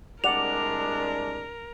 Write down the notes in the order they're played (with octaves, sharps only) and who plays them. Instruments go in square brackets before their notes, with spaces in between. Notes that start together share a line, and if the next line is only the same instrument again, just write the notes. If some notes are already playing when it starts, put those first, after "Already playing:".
[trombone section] C2 G#3 D4 [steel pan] G4 D5 F#5 [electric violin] A#4 [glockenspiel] F7